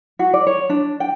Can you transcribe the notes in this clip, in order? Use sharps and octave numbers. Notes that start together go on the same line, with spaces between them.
F#4
D5
C#5
D4
G5